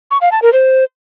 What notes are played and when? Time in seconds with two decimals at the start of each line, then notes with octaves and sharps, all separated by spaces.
0.11 C#6
0.21 F5
0.32 A5
0.42 A#4
0.53 C5